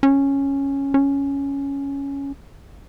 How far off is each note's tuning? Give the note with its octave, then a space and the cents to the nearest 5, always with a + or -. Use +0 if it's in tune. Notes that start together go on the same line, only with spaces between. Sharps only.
C#4 -5
C#4 +5